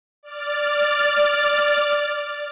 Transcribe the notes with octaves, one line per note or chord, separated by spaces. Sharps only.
D5 F6 A6